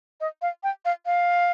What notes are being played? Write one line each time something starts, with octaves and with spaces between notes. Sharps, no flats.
D#5
F5
G5
F5
F5